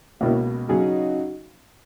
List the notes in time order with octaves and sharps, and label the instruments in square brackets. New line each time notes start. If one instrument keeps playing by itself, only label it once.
[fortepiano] C#2 B2 A#3 [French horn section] C#4 E4
[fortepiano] C#3 F#3 C#4 G#4 [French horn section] D#4 F#4